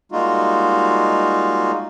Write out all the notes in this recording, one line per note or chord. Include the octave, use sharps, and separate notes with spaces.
G3 G#3 A#3 D#4 F4 F#4